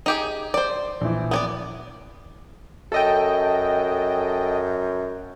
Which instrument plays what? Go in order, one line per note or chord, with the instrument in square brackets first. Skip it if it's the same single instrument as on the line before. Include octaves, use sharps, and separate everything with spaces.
[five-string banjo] D#4 G4 G#4
C5 D5
[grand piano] A#1 E3
[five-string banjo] B3 C#5 D5
[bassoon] F#2 [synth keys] A4 D#5 G5